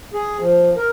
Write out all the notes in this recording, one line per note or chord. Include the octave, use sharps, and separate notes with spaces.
G#4
F3
A#4